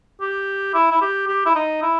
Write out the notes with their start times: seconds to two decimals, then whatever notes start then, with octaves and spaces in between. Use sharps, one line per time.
0.21 G4
0.74 E4
0.92 E4
1.01 G4
1.28 G4
1.46 E4
1.56 D#4
1.82 E4